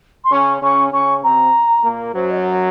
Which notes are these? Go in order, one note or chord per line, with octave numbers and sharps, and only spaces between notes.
C6
C#3 C#4 C#6
C#3 C#4 C#6
C#3 C#4 C#6
C3 C4 A#5
A#2 A#3
F#2 F#3 C5
D#5
C#5